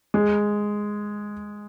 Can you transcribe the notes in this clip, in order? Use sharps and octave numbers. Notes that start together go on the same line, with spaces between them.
G#3